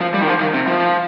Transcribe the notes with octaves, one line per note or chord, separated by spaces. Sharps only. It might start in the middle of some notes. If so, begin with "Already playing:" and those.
F3
G3
D#3
F3
D#3
C3
F3